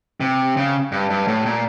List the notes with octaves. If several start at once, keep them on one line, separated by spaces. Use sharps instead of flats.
C3
C#3
G2
G2
A2
A#2